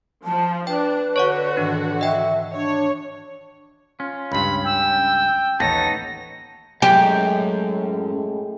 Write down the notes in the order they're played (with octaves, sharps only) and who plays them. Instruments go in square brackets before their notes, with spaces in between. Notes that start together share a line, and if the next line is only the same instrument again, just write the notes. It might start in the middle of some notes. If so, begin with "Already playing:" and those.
[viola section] F3 [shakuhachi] A5
[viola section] D4 [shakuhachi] B4 [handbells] G5
[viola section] D3 F#4 [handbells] C#5 D5 F#5 [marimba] C#6
[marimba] G#2 D#3 E3 [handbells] D4
[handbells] D#5 G5 [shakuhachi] E5
[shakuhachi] D4 [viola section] C#5
[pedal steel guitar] C#4 [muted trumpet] F4
[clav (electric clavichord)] C#2 G2 [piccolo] B5
[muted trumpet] G5 [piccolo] E6
[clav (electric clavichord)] A1 D#2 [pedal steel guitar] B3 D#4 C#5 [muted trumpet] A5 [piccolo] A#6
[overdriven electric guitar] F#2 [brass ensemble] A2 G#3 A3 [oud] G4